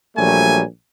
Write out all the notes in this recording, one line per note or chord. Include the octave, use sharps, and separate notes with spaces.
A#1 F#3 G3 A3 G#5